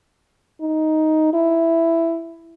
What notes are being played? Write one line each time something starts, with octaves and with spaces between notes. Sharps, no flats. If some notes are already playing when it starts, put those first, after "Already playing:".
D#4
E4